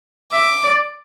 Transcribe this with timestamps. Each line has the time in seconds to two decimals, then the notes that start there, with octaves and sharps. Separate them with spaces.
0.32 E5 D6
0.63 D5